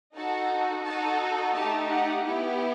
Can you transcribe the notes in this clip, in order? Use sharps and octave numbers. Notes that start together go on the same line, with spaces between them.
D#4 F#4 A4 A5
D#4 F#4 A4 A5
A3 D#4 G4 A5
F#5
B3 E4 G4